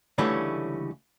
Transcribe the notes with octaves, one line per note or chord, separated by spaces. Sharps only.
C#2 D3 E3 G3 A3 C#4